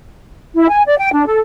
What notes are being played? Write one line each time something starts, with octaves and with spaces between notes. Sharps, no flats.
E4
G#5
D5
G5
D4
A4